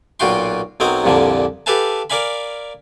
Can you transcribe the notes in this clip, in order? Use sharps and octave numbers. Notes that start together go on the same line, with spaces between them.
B1 A#2 F4 F#4 G5 C6
B1 F#3 C4 A#4 C5 D#5
C2 F2 A#2 D3 F3 A#3
G4 A4 B4 F5 G#5 A5
A#4 D5 F5 G#5 B5